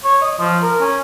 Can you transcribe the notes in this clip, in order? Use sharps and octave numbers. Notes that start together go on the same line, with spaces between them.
C#5
D#5
F3
A#4
C#4